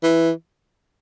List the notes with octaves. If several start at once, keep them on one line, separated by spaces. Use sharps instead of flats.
E3